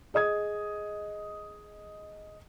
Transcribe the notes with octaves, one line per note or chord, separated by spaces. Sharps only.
G#4 D#5 D#6 G#6